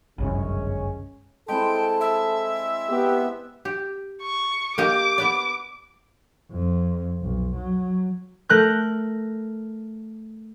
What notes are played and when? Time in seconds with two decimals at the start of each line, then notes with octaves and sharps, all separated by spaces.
0.18 G1 C2 F#2 C#3 G#3 C#4
1.48 G#3 C4 E4 A4 G5 A5
2.01 E5
2.89 B3 G4
3.65 G4
4.22 C#6
4.78 A#3 G4 D#5 D6
5.18 B3 B4 D5
6.52 F2
7.22 B1
7.56 F#3
8.49 A3 A#4 F#6 G6